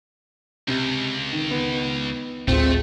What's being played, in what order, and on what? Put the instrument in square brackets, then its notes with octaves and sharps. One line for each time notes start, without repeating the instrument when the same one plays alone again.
[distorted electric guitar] C#2 [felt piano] C3
[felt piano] D#3
D#3 B3
[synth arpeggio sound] A1 D2 A2 [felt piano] G#3 F4 [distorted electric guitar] A3 [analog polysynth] C4